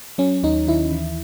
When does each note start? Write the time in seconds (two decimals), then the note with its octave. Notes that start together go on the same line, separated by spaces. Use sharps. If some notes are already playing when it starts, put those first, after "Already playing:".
0.18 F#3 C#4
0.43 D#2 D#4
0.67 D#3 E4
0.92 E3